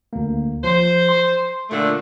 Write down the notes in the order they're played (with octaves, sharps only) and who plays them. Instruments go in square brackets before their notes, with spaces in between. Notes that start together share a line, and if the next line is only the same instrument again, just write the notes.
[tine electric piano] D2 A#3
[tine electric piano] F3 [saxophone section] C5
[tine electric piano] C6
[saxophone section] A#2 D3 A3